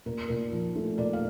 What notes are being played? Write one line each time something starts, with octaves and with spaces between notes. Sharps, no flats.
A#2 A#4
A#2 A#4
F3
A3
A#2 A#4 D5
F5